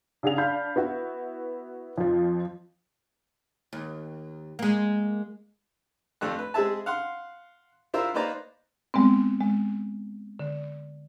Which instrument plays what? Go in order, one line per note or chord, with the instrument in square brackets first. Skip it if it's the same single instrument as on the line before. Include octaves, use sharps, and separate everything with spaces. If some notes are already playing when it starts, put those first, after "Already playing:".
[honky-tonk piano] C#3 D4 G#4 F#5 F7
D4 F5 B5 G6
B3 E4 F#4
F2 F3
[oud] D#2
G#3 A#3
[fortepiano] F2 A3 D4 F#6
B4
G#3 C4 G#4 E5 A5
F5 F#5 C6
D4 E4 F4 A#4 C5 E5
A#3 D#4 B4 C5 D5 A#5
[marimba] G3 G#3 B3 C4
G#3
D3